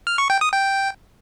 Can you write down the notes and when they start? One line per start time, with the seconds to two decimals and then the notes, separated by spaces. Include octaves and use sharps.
0.07 F6
0.18 C#6
0.30 G5
0.41 D#6
0.53 G5